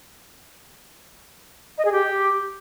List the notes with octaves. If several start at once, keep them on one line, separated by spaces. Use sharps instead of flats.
D#5
G#4
G4